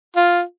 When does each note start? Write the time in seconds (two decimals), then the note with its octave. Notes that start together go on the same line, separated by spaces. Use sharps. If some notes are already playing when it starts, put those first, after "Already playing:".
0.16 F4